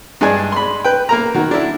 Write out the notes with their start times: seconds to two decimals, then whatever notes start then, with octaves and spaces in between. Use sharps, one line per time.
0.21 G2 G#3 D4 G#5
0.52 B5 C6
0.84 B4 G5
1.09 A#3 A#4 A#5
1.34 D#3 F#4
1.51 D4 E4